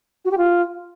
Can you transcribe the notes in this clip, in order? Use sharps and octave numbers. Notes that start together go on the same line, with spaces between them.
F#4
G4
F4